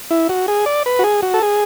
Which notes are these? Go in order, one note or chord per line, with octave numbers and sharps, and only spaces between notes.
E4
F#4
G#4
D5
B4
F#4
G#4
F#4
A4
G#4